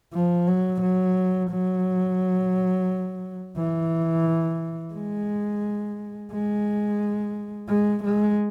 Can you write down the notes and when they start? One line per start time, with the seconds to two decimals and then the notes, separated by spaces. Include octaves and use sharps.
0.13 F3
0.47 F#3
0.81 F#3
1.50 F#3
3.57 E3
4.94 G#3
6.32 G#3
7.68 G#3
8.04 G#3